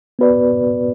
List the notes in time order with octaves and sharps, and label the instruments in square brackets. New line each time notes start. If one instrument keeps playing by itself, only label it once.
[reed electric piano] B3 F#4 B4 D5